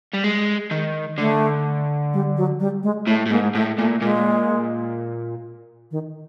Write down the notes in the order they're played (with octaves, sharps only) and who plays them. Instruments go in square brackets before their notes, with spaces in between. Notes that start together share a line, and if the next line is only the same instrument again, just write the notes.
[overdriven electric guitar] G3
G#3
D#3
[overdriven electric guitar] D3 [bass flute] A3
[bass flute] G3
F#3
G3
G#3
[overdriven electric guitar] A2 [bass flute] A3
[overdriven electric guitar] A2
[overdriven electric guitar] G#2 [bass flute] A#3
[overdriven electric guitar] A2 [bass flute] A3
[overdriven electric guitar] A#2 [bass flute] A3
[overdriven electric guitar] A#2 [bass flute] G#3
[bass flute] D#3